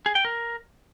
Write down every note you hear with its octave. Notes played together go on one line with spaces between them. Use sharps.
G#4
G5
A#4